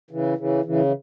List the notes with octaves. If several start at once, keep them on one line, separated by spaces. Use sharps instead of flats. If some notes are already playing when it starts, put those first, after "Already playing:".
C#3 E3
C#3 E3
C#3 E3
E3